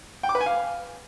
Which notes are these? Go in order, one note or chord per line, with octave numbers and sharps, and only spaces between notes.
G5
D6
B4
G#5
F5